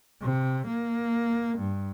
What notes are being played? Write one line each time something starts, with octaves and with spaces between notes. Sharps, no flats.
C3
A#3
G2